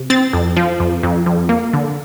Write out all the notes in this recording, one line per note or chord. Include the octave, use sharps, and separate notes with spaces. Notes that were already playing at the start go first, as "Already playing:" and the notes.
Already playing: C3
C4 A6
F2
F3
F2
F2
F2
A#3
D3